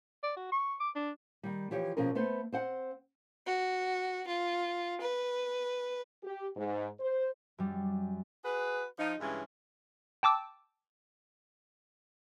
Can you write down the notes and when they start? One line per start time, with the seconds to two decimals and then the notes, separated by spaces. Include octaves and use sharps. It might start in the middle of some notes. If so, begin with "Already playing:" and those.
0.23 D5
0.36 F#4
0.52 C#6
0.80 D6
0.95 D4
1.43 D#3 G3
1.71 E3 F3 G4 C#5
1.97 B2 F3 C4 C#4 G#4 A#4
2.15 A3 B3 B4 C5
2.52 C4 C5 F#5
3.46 F#4
4.27 F4
5.01 B4
6.23 G4
6.56 G#2
7.00 C5
7.58 F#2 G3
8.45 F#4 G#4 B4
8.99 F3 D#4
9.20 G2 C#3 E3 G#3 C#4
10.23 G5 A5 D6 E6